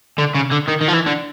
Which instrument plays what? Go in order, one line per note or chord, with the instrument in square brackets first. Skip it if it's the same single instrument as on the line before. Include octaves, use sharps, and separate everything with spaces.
[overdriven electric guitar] D3
C#3
D3
D#3
D#3
F3
E3
D3